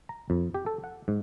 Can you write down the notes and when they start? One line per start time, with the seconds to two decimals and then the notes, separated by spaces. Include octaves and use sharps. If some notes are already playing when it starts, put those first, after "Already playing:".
0.09 A#5
0.30 F2
0.54 G4
0.66 A4
0.84 F#5
1.08 G#2